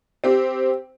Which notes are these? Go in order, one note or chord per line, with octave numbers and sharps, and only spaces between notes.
C4 G4